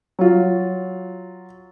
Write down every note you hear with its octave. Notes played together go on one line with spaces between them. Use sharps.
F#3 F4